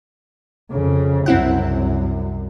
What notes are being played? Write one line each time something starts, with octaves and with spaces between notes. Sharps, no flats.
F2 C#3
C2 F#2 C4 E4 F#5